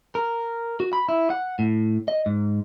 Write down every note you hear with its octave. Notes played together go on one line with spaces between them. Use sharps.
A#4
F#4
B5
E4
F#5
A2
D#5
G#2